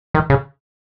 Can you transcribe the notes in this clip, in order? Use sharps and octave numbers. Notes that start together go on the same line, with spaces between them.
D#3
C#3